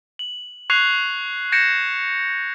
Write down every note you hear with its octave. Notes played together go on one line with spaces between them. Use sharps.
F#7
C#6 F#6 G#6 C7 F7
G6 G#6 A#6 C#7 D7 E7